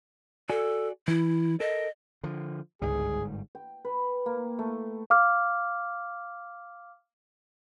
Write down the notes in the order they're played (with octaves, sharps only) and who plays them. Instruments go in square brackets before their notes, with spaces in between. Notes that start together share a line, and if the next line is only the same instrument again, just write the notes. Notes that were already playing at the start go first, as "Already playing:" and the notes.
[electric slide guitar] F#4 D5 G#5 [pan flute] A4
[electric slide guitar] E3 [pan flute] E4
[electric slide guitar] A4 A#4 [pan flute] D#5
[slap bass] D3 F3
[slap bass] G1 G#2 G3 [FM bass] C#2 [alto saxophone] G#4
[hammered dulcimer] G5
B4
A#3
A3
[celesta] F5 D6 F6